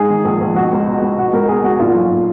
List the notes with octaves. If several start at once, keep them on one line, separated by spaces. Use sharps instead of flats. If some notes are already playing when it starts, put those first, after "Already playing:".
Already playing: G#2 G#4
D#3
A#1
A#1
B2 F#4
C#2
B2
C#2
B2 F#4
C#2 A#4
B2 G#4
C#2 F#4
A#2 F4
B1
A#2